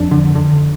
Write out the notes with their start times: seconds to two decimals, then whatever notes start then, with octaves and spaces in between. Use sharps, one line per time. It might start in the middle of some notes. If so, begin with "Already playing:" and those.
Already playing: F2 D4
0.11 D3
0.35 D3